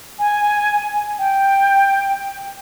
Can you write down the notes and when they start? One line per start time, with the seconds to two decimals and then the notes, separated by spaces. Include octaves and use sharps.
0.19 G#5
1.19 G5